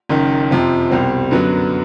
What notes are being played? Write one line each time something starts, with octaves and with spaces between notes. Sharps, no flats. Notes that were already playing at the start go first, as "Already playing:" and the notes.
F#1 F#2 D#3
F2 C3 F3
C2 B2 G3 C4
F#2 D3 F#3 B3